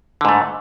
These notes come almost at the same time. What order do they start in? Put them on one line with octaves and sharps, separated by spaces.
D3 G#2 A3